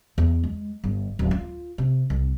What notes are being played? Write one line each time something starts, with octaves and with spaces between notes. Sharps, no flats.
E2
G#3
G1
D1
F4
C3
C2